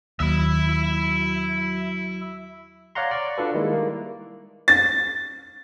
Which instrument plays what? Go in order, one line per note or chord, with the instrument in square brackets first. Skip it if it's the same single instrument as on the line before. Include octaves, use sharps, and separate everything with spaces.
[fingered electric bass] D#2 [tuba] F#3 [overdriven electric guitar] E4 E5
[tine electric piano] C#5 D5 F5 F#5 A#5 C6
D5 C#6
D4 F4 F#4 A4 B4
D#3 G3 G#3 A#3 E4
A#3
[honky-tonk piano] A6